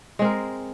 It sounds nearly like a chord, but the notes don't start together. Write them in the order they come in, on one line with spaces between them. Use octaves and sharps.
G#3 C4 A#4